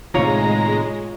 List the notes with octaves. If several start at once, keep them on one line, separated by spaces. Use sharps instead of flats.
A2 C3 D#3 G#3 F4 C#5 F5 A#5